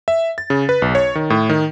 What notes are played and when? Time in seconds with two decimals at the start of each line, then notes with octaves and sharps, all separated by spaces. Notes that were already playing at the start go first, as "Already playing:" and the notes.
0.08 E5
0.38 A6
0.50 C#3
0.69 B4
0.82 B1
0.95 C#5
1.15 D#3
1.30 A2
1.49 D#3